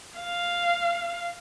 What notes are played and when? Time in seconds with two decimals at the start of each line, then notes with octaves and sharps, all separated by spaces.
0.19 F5